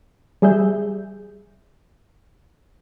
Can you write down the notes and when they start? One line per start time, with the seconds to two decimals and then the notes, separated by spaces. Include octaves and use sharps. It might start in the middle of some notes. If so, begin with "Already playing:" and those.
0.42 G3 G#4 E5 G6